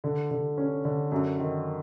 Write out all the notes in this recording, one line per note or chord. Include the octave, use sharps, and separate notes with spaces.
D3
D3
C#4
D3
F#2
D#3